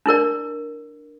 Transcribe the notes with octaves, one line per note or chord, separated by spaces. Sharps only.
D4 E4 A#4 D5